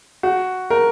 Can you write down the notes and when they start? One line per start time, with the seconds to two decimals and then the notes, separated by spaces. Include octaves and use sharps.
0.23 F#4
0.70 A#4